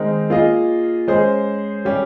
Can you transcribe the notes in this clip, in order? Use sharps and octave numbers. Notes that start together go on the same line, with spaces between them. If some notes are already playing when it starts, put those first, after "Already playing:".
Already playing: D#3 G#3 C4 D#4 A#4
A#3 F4 G#4 D#5
G#3 C#4 G#4 C5
G3 C#4 G4